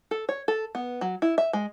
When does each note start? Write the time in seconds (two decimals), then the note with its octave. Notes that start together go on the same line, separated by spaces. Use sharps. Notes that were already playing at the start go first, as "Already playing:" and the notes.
0.11 A4
0.29 C#5
0.48 A4
0.75 B3
1.01 F#3
1.22 E4
1.38 E5
1.53 G#3